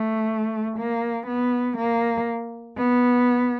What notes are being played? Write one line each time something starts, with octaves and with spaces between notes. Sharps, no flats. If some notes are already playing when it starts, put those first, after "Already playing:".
Already playing: A3
A#3
B3
A#3
B3